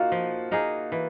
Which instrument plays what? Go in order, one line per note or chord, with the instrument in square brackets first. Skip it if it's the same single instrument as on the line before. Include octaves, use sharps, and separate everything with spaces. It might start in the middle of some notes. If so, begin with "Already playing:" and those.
Already playing: [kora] A#3 D#4 [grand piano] F4 F#4
[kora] F3
A#3 D#4 G#4
E3